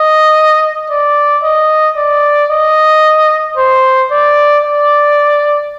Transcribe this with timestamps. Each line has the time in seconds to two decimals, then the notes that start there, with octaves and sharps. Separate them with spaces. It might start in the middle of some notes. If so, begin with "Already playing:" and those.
Already playing: D#5
0.90 D5
1.43 D#5
1.97 D5
2.51 D#5
3.57 C5
4.11 D5
4.65 D5